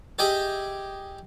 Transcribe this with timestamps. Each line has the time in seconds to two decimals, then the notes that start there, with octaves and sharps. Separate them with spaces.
0.19 G4 G#4 D#5 E5 G5